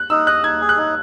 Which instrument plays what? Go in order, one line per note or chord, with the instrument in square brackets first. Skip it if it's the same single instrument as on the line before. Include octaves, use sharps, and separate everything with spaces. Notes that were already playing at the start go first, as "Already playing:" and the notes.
Already playing: [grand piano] F#6
[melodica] D#4 [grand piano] E6
[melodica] D#5 [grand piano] F#6
[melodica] D#4 [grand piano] G#6
[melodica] G#4
[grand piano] F#6
[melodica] D#4